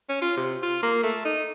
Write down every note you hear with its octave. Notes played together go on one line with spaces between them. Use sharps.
C#4
F4
C3
F4
A#3
A3
D#4